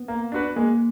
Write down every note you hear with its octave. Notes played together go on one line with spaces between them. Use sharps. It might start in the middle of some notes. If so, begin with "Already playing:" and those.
Already playing: B3
A#3
D4 F#4 B4
G#3 A#3